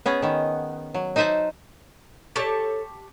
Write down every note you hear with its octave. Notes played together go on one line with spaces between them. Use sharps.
B3 C#4 G#4
D#3 B3
F#3
D#4 C5 D#5 E5 F#5 A5
G4 A4 C#5 D5 A5 C#6